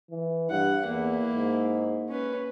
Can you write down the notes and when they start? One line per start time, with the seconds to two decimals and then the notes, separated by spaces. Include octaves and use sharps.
0.11 E3
0.51 G2 F#5
0.86 E2 A#3 E4
1.31 G#2
2.09 C#4 B4